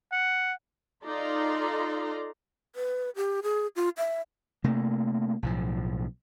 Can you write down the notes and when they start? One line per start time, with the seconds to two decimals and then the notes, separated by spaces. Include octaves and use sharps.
0.12 F#5
1.05 D#4 F4 A4 D5 A#5 C6
2.76 B4
3.16 G4
3.43 G#4
3.76 F4
3.97 E5
4.64 C3 A3 A#3
5.43 B1 A2 F3